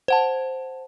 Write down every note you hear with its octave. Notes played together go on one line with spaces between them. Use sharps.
C5 F#5 A5